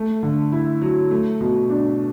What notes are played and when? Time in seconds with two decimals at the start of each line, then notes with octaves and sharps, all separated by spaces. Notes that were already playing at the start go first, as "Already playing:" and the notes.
Already playing: A3
0.23 D3
0.52 E4
0.82 F#3
1.11 A3
1.41 B2
1.70 D4